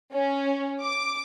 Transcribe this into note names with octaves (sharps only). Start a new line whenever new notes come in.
C#4
D6